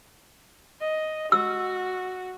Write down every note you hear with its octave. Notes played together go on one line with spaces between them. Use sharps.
D#5
F#4 E6